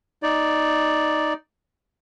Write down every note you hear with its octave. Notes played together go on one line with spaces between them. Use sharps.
D#4 D5